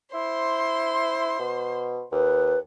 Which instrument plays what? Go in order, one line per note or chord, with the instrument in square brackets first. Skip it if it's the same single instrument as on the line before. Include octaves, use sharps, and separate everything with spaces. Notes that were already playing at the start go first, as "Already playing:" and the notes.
[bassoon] E4 [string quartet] C5 C6
[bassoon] B2
[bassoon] D#2 [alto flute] B4